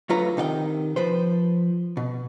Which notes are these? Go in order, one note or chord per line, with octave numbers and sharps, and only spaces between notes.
D2 D3 F#3 F4 B4 A#5
C3 D#3 F5 G5
F3 B4 C5
B2